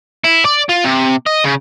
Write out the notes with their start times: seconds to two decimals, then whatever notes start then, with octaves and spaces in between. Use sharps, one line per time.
0.24 E4
0.45 D5
0.69 F4
0.84 C3
1.26 D#5
1.44 C#3